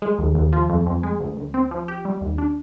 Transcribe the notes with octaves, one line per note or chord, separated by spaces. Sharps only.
G#3
D#2
D#2
F3
F2
F2
G#3
D2
D2
C4
F3
G4
G3
D#2
D4